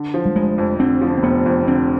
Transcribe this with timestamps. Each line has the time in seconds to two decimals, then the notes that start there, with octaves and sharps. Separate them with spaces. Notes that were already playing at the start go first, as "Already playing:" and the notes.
Already playing: D3
0.14 F3
0.26 G3
0.36 F1 G#3
0.58 F2
0.79 D3 C4
1.01 F3
1.18 C4
1.23 F1 B3
1.46 F2
1.67 D3 C4